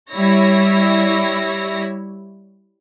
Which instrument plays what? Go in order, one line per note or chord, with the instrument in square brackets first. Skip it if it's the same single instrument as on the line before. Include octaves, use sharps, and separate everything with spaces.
[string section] G3 E4 C#5 A#6